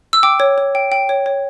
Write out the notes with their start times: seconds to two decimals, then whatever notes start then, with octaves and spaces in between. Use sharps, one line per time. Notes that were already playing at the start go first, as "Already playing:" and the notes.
0.13 E6
0.23 G5 D6
0.40 C#5
0.58 C#5
0.75 G5
0.92 G5
1.09 C#5
1.26 C#5